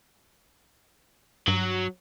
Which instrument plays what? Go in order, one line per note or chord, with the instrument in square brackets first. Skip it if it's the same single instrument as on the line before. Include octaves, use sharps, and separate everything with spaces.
[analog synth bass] G2 [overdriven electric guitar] F#3